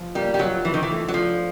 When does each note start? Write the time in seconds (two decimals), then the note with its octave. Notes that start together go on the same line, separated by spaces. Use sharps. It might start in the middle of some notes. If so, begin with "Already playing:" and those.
Already playing: F3 F4
0.15 G3 A#3
0.34 G3
0.39 F#3 F4
0.65 E3 F3
0.74 D#3
0.83 E3
0.90 A3
1.08 F#3
1.14 F3 D4